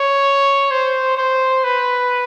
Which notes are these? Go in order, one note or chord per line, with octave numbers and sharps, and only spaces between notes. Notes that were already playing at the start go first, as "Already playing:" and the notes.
Already playing: C#5
C5
C5
B4